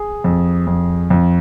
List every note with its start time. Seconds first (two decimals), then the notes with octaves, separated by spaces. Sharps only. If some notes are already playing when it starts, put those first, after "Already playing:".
Already playing: G#4
0.24 F2
0.67 F2
1.10 F2